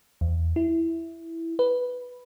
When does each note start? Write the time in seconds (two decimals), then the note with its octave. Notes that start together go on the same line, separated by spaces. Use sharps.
0.21 E2
0.56 E4
1.59 B4